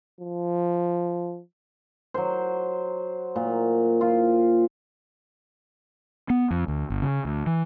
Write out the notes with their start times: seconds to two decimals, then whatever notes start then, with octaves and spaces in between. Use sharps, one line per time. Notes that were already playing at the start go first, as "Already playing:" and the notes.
0.21 F3
2.14 F#3 C5
3.36 A#2
4.01 F4
6.30 B3
6.51 F2
6.68 D2
6.90 G1
7.02 C#3
7.25 D2
7.46 E3